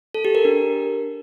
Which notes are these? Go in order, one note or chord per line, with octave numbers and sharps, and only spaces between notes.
A4
G4
A#4
D4